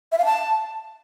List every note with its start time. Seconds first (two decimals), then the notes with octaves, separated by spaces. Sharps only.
0.12 E5
0.19 F5
0.25 A5